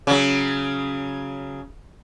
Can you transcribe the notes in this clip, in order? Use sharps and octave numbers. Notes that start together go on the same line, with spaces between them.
C#3 F#3